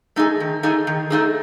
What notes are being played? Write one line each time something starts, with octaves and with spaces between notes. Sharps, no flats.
A3 D#4 G#4
D#3
A3 D#4 G#4
D#3
A3 D#4 G#4